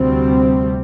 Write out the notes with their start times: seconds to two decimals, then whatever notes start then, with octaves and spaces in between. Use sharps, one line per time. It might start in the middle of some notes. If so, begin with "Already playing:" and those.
Already playing: D2 C3 G3 C4